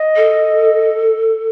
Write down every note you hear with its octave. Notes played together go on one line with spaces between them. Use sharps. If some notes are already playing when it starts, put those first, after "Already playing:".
Already playing: D#5
A4